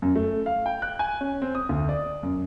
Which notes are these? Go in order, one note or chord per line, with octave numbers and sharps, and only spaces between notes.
F#2
A3
F5
G5
F#6
G#5
C#4
C4
D#6
D2
D5
F#2